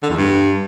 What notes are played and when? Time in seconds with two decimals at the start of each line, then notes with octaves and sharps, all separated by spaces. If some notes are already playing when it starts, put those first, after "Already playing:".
0.03 D3
0.10 E2
0.17 G2